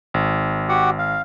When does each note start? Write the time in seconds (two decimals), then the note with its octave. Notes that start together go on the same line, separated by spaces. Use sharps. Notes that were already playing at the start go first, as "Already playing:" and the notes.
0.14 G#1
0.69 F#4 G4 F#5
0.99 F5